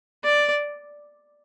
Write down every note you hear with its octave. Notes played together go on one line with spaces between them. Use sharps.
D5